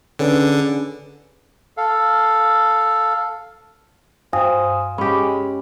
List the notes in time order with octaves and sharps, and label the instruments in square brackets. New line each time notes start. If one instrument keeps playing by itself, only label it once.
[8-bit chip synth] D3 [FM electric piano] C#4 G#4 B4
[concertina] A4 F5
[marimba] G2 [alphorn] C5 [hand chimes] F5 G#5 D#6
[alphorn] G#3 [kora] C#4 G4 [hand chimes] B5